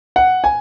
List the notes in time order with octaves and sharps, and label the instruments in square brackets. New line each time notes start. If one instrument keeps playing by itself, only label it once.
[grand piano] F#5
G#5